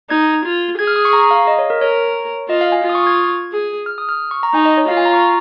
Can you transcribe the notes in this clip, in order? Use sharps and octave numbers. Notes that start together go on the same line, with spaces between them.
D#4 G#6
F4
G#4 G#6
F6
D#6
C#6
A#5
F5
D#5
C#5
A#4
A#4 C#5
F4 D#5
F5
G#5
F4
D#6
C#6
G#6
G#4
F6
D#6
F6
C#6
A#5
D#4 G#5
D#5
C#5
F4 F5
G#5
A#5
C#6